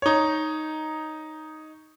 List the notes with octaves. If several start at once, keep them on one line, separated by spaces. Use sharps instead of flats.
D#4 C#5